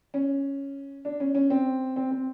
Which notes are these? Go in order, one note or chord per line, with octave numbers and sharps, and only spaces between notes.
C#4
D4
C#4
C#4
C4
C4
C4